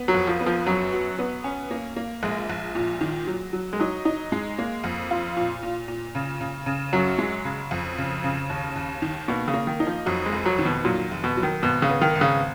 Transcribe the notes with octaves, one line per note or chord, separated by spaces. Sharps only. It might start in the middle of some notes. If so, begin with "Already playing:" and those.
Already playing: B3
F#3
F2
F3
B3
F3
F#2 F#3
F#4
B3
C#4
A#3
A#3
A#1 G#3
A#1
A#2
D#3
F#3
F#3
G#3
F#3 D#4
D#4
G#3
A#3
F2
F4
A#2
A#2
A#2
C#3
C#3
C#3
F#2 F#3
G#3
C#3
F2
C#3
C#3
D#2
D#2
D#3
B2 A#3
C#3
A#3
D#3
D#4
F3
F2 F#3
G#3
F1
F#3
D#3
B2
A#2 F#3
F1
B2
F#3
D#3
G#1 B2
C#3
B3
D#3
G#1
C#3